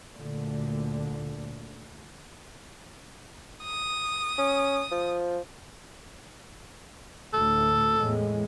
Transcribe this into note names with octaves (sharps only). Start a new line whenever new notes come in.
D2 A#2 D3
D#6
C#4
F3
D2 A2 A4
E2 A2 G#3